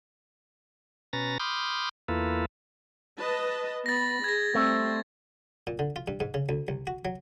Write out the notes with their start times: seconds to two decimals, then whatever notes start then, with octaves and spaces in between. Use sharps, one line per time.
1.13 B2 C#4 B4 A#5 A6 A#6
1.40 B5 C6 D6 D#6 F6 G6
2.08 E2 A#3 E4 F4 A4 B4
3.20 B4 D#5 A5
3.86 B3 B5 A6 A#6
4.24 G#4 G#6 A#6
4.55 G3 A3 C4
5.67 A#2
5.79 D3
5.96 F4
6.08 G2
6.20 G#2
6.34 C#3
6.49 D2
6.68 C2
6.87 F#4
7.05 F#3